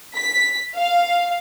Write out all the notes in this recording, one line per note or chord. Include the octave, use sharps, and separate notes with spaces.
B6
F5